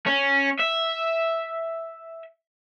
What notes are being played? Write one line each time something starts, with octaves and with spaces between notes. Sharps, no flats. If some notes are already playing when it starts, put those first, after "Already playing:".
C#4
E5